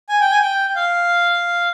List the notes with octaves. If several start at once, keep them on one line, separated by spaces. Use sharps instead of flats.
G#5
G5
G#5
G5
F5